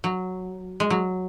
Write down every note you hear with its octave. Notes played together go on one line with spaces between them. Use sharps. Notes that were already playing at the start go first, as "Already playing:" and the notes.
F#3
G#3
F#3